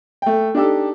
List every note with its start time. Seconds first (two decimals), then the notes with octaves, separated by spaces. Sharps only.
0.22 A3 G5
0.55 D4 D#4 G4 A4